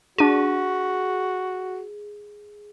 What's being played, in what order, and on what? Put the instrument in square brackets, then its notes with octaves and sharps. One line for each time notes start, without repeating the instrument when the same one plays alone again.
[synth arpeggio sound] D4 D#7 [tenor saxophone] F#4 [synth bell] G#4